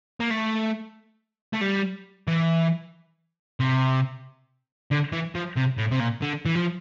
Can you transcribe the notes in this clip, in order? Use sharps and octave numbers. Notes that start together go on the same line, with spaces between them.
A#3
A3
A3
G3
E3
C3
D3
E3
F3
C3
A2
C3
A#2
D3
E3
F3